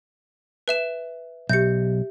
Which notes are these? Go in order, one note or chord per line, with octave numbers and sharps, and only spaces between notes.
B4 E5 E7
B1 G4 E5 G6 C#7